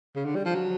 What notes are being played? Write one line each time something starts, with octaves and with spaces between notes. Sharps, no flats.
C#3
D3
G3
F3
F#3